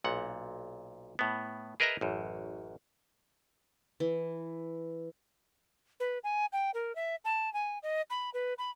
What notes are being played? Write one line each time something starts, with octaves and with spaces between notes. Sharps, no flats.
B1 A#2 F#5
A2 B3
G#4 A#4 B4 D#5 E5 A#5
A1 F#2
E3
B4
G#5
G5
A#4
E5
A5
G#5
D#5
B5
B4
B5